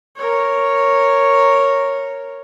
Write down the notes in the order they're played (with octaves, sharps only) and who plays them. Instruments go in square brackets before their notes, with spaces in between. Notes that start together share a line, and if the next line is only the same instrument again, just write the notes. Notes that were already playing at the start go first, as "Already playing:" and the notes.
[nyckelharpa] A#4 C#5